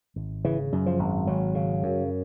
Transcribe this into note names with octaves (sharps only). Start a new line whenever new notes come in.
G#1
C#3 E3
F#2
F3
G#1
G#1 F#3
C#3
F#2